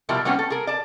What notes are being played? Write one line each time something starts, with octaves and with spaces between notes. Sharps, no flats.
B2 F3 G3 E4 G4 A#4
G3 A#3 B3 C#4 F#4 G4
A4
G#4 A#4
D5 A5